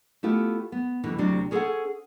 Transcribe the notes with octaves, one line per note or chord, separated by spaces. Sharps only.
A3 B3 E4 F4 G4
B3
B2 D3 E3 G3
D2 C3 F#3 C4 D4
C#4 G#4 A4 B4 C5 F#5